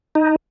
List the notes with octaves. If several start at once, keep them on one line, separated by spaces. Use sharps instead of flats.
D#4